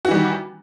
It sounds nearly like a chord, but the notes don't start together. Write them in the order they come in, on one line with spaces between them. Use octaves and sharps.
F#4 E3 G3 D#3